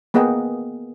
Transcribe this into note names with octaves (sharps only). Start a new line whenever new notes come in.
A#3 B3 G#4 D#5 F#5 G5